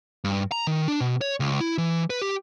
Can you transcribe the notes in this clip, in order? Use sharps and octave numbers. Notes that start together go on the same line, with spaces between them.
G2
A#5
D#3
D4
B2
C#5
C#2
E4
E3
B4
G4